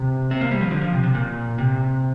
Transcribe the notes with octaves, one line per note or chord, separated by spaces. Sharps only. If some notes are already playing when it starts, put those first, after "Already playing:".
Already playing: C3
C4
A#3
G3
F3
D3
F3
C3
C3
A#2
C3